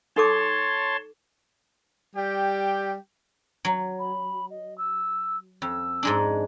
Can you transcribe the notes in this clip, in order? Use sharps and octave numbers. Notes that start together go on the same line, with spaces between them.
D#4 A4 C#5 A5 C6 D6
G3 G4 G5
F#3
B5
D#5
E6
F2 E6
G#2 G#3 D4